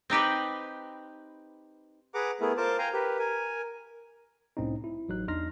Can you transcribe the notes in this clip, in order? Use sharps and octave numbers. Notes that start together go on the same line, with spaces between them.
C4 D#4 G4 B4
G#4 B4 F#5 A#5 D6
A3 B3 E4 G#4 A#4
F4 A#4 C5 A5 D6
F5 G5 G#5 A#5
G4 A#4 B4
A#4 G#5
C2 A2 C4 C#4 D#4
E4
A1 F#3 D#4 F#6
E2 D4 D#4 C6 F6 A#6